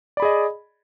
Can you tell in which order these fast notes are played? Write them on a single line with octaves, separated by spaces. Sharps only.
D5 B5 G#4 D#5